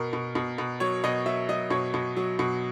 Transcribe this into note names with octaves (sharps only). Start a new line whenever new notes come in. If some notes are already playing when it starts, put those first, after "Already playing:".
Already playing: B2 A#4
B2
B2
B2
F#3 C#5
B2 D#5
F#3 E5
F#3 D#5
B2 C#5
B2
F#3
B2